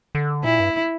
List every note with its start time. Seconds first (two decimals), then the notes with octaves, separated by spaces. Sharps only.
0.15 D3
0.44 A#2 E4
0.60 G2